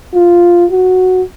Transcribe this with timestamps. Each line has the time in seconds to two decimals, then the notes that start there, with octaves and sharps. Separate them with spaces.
0.14 F4
0.71 F#4